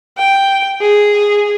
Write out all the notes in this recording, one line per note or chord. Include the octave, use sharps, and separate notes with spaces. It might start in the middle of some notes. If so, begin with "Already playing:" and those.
G5
G#4